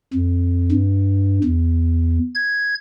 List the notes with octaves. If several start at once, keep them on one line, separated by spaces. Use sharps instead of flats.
F2
G2
E2
G#6